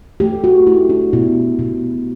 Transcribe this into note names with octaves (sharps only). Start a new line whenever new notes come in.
A3 G4
F#4
A3 E4
D4
B2 E4
B2